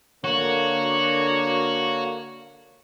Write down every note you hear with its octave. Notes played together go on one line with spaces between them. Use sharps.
D3 A#3 F#4 C#5